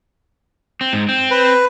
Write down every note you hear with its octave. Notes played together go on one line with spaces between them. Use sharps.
C4
G#2
C4
B4